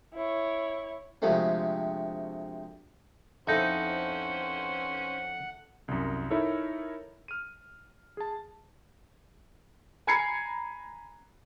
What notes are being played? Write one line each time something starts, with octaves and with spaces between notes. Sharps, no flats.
E4 C#5
D2 C3 F3 G#3 A3 C4
F2 C#4 D#4 E4 A4 C5 F#5
C2 F#2
D#4 E4 A4 A#4 C#5 E5
F6 D#7
G#4 A5
G#5 A#5 B5 G#6 C7 C#7